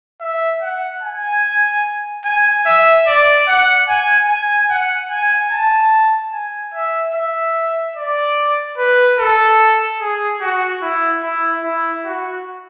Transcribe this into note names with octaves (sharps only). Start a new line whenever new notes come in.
E5
F#5
G#5
G#5
E5
D5
F#5
G#5
G#5
F#5
G#5
A5
G#5
E5
E5
D5
B4
A4
G#4
F#4
E4
E4
E4
F#4